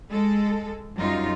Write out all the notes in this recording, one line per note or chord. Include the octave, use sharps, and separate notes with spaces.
G#3 A4
F#2 G3 D#4 F4